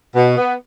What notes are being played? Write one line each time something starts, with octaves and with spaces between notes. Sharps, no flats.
B2
B3